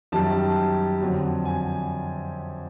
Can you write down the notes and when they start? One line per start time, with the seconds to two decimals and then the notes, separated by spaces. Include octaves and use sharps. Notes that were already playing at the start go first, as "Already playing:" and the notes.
0.12 F#2 D#3 G3 A5
1.01 F2 D3 F#3
1.45 G#5